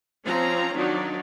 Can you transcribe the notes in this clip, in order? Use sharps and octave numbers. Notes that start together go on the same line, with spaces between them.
F3 C4 C#4 A#5
D#3 F#3 D4 D#4